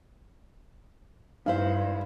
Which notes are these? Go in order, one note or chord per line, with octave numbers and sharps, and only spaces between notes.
G2 D#4 E4 C5 F5